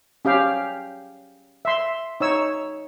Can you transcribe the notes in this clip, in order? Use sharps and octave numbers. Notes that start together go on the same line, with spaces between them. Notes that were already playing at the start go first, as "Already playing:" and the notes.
C#4 G4 F5 G5
E5 C6
D#4 C#5 E6